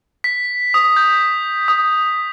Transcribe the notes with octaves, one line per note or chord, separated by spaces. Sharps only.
B6
D#6
G6
D#6